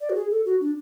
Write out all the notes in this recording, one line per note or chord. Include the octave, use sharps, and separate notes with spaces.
D5
F#4
G#4
A4
F#4
D4